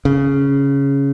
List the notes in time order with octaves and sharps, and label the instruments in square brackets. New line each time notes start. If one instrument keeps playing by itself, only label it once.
[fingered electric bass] C#3